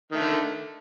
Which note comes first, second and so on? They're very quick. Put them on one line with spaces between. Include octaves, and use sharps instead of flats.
D#3 A3 D3